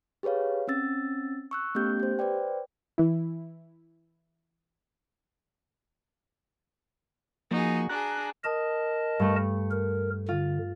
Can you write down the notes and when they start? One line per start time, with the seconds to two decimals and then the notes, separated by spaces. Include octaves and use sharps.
0.23 G4 G#4 B4 C#5 F5
0.67 C4 C#4 E6 A6
1.51 C#6 E6 F#6
1.75 A3 B3 C#4 G4 G6
2.00 G4 C5
2.19 B4 C5 D5 G5
2.98 E3 E4
7.51 F3 A#3 D#4 F#4 G#4
7.89 D4 G#4 A#5 F#6
8.44 A#4 D#5 A5 D#6
9.19 G2 A3
9.71 A#4
10.28 D3 F4